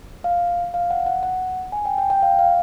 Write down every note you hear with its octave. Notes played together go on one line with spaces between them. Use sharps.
F5
F5
F#5
F#5
F#5
G#5
G5
G5
G5
F5
F5